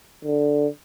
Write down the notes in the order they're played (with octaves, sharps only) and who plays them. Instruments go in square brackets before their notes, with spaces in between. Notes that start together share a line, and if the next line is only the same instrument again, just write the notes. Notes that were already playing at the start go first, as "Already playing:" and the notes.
[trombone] D3